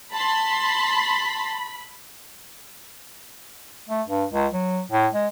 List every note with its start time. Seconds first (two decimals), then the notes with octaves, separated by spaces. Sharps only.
0.12 A5 B5 C6
3.89 A3
4.08 G2
4.33 C#2
4.53 F#3
4.91 A2
5.14 G#3